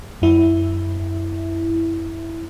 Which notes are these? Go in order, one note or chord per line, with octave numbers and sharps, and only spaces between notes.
F#2 E4 E5